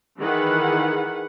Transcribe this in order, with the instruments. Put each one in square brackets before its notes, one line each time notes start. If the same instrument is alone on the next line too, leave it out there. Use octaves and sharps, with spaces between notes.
[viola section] D#3 E3 G#4 B4 F#5